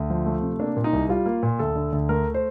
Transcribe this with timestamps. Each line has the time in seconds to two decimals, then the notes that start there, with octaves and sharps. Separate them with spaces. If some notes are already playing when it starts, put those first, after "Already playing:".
Already playing: D2
0.10 F3
0.26 A3
0.42 C3
0.59 A#3 D4
0.77 A#2
0.84 D#4
0.93 C2
1.09 G3 F4
1.26 A#3
1.43 A#2
1.59 D2 A4
1.76 D3
1.92 D2
2.09 A3 A#4
2.34 C5